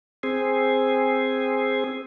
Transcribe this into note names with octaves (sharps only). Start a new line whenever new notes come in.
C4 G#4